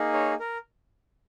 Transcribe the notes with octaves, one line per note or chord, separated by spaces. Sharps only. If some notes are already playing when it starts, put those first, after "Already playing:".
Already playing: A#3 D#4 G#4
C#5
A#4